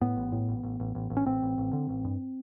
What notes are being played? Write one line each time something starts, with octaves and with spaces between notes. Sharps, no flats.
A2 B3
A1
A2
A1
A1
A1
A1
A1
C#4
A1 C4
A1
A1
D3
A1
G2